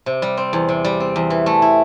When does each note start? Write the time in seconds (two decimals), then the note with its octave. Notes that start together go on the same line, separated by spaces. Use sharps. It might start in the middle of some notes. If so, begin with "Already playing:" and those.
0.06 C3
0.22 G3
0.37 C4
0.53 E2
0.69 C3
0.84 G3
1.00 C4
1.16 E2
1.30 E3
1.46 A3
1.62 E4